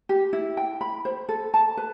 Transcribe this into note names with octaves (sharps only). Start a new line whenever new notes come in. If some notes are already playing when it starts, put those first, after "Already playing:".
G4
E4
G5
B5
C5
A4
A5
B4